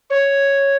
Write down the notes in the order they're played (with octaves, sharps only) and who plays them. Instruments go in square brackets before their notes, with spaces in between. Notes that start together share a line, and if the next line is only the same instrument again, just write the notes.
[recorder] C#5